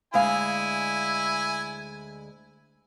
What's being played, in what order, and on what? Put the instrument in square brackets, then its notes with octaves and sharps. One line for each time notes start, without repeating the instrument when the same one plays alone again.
[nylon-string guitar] D2 G#3 F5 [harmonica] E4 G#5